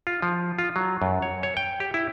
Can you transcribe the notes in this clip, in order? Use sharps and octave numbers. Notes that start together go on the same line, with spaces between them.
F4
F3
F4
F#3
F#2
C#5
C#5
G5
G4
E4